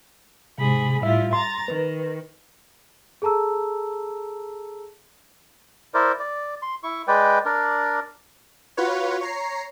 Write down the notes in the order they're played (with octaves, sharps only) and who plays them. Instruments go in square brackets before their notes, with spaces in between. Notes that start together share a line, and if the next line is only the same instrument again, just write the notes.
[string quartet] G#2 G#4 B5 [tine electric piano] C3
[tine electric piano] A2 E5 [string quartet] G3 E4 F4
[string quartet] A#5 A6 [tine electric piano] C6
[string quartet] D#3 [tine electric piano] B4
[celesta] G#4 A4 A5 A#5 E6
[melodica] E4 A#4 C5 D5
D5
C6
E4 C#6
G#3 B4 D5 G5
D4 A#4 D5
[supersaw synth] F4 F#4 B4 C#5
C#5 A#5 C7